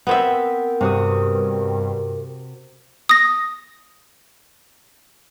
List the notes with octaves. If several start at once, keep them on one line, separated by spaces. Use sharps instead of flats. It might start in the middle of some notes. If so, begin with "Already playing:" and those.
B3 C4 A#4 E5
G2 C3 F#4 D#6
D#6 A#6